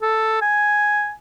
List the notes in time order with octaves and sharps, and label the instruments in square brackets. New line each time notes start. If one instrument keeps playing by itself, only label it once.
[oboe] A4
G#5